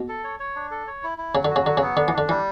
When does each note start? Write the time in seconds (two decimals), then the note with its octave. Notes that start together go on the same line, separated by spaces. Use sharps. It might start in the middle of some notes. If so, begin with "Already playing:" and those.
Already playing: B2
0.08 A4
0.24 C#5
0.40 C#5
0.56 D4
0.71 A4
0.87 C#5
1.03 E4
1.18 E4
1.35 C#3 F#3
1.45 D3
1.50 F#4
1.56 C#3
1.66 D3 F#3
1.77 C#3 B3
1.97 D3 D4
2.08 E3
2.13 D3 D4
2.29 E3 G3